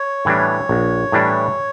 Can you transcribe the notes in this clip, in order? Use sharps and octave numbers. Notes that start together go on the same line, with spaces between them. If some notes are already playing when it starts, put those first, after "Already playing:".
Already playing: C#5
A2 E3 G3 D4
A#1
A2 E3 G3 D4